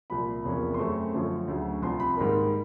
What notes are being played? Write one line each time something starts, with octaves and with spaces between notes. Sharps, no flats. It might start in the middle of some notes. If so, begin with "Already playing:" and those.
C2 A#2 F3 B5
E2 C3 F3 A#3 C#4
C6
F#2 C#3 F#3 A3 C4 C#6
F#2 D3 F3 A3 C#4
D2 C#3 F#3
C2 C3 F3 C6
B5
G#2 D#3 G3 A#3